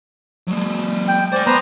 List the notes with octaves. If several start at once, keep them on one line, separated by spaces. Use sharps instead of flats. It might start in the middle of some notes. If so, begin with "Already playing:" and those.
F#3 G#3
G5
C5 D5 G#5
B3 B4 C5 A#5